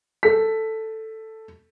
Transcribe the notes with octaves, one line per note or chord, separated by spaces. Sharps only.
A4 B6